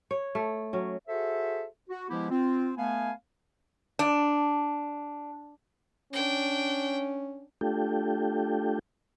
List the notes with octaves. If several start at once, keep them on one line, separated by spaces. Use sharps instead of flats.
C#5
A3
F#3 C#4
F#4 G#4 A4 C5 E5
F#4
F3 G#3 B3 E4 G4
C4 F4
A3 B3 F5 G#5
D4
C#4 D4 G5
A3 D4 F4 G4 A4 G5